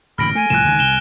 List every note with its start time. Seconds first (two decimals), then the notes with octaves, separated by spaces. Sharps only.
0.18 D1 A1 F#2 B5 F6 A#6 D7
0.35 A3 G#5
0.50 C2 A2 F3 F#6 E7
0.64 C#2 D#3
0.79 C2 E7 G7